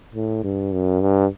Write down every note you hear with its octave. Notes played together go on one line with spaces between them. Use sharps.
A2
G2
F#2
G2